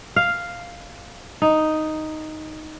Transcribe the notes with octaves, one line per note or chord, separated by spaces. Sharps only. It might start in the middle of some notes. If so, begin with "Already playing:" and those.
F5
D#4